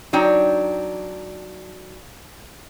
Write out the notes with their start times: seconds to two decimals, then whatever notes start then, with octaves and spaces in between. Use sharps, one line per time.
0.13 F#3 D4 D#4 G5